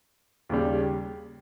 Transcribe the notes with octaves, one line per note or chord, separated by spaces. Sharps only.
D#2 C#3 G3